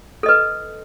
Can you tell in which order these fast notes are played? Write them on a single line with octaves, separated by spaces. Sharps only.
A4 D#5 B4